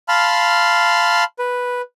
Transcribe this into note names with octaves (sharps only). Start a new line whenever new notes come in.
F5 A5 B5 C6 F6
B4